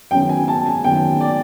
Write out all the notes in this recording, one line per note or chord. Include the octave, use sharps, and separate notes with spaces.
F#2 D#3 F#3 B3 G5
G#5
A5
G#5
F#2 D#3 F#3 B3 G5
D5